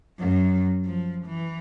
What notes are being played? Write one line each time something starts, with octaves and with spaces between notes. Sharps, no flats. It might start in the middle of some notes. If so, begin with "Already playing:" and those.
F#2
F3
E3